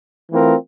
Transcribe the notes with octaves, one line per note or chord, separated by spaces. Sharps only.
E3 A3 C4 F4 A#4